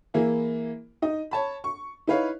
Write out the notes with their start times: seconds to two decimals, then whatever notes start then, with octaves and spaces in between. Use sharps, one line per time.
0.14 E3 A#3 E4 G#4
1.02 D#4 D#5
1.31 C#5 A5 B5
1.64 C#6
2.07 D#4 E4 B4 C#5 F5